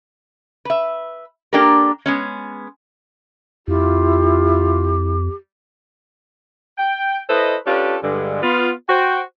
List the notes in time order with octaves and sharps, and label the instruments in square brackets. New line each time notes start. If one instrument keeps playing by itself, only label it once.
[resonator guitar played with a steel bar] B4 E5
A#3 D4 G4 A4 A#4
G#3 B3 C#4
[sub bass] F2 [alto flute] E4 [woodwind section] F4 [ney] G4
[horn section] G5
E4 A4 B4 C5 D#5
C#4 D4 F4 G4 A4 B4
G2 D3 G#3
B3 F4
F#4 C5 G5